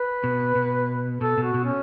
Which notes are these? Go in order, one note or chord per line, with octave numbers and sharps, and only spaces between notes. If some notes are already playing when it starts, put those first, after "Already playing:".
Already playing: B4
B2
B2
B2 A4
B2
F#4
B2
C#4